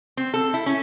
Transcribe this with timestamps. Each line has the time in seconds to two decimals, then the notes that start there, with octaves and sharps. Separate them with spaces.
0.17 C4
0.34 A4
0.54 E4
0.66 C#4